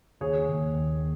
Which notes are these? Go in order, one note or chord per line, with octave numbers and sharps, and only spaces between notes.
D#2 G#4 C#5
D#2
D#2